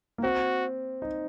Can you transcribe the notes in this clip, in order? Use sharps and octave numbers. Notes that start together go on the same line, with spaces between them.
A#3
C4 F#4
D#4